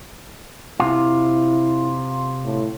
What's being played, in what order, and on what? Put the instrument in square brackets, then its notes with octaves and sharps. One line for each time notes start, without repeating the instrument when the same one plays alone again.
[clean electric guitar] C3 F4 [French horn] E4
[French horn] A2